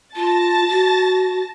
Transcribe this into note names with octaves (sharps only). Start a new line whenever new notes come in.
F4 A5 A6 A#6
F#4